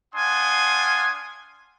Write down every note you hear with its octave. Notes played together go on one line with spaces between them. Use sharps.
D4 F5 F#5 G#5 C6 D#6